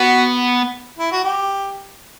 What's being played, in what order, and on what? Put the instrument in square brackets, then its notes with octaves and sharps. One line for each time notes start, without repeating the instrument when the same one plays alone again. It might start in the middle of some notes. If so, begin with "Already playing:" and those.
Already playing: [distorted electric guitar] B3 [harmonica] F#4
[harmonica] E4
F#4
G4